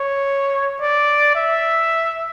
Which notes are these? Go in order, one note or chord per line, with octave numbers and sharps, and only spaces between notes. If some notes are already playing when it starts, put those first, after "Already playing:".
Already playing: C#5
D5
E5